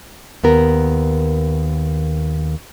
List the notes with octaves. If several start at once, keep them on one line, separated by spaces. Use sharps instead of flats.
D#2 B3 A#4